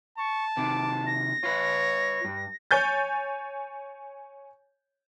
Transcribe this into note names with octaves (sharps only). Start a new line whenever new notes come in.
A5 C#6
C3 D#3 D6
A#6
F4 B4 C#5
G2
C#5 G#5 G6 A6